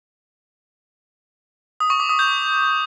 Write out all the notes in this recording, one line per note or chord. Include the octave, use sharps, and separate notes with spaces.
D#6
C#6
D6
D#6
G6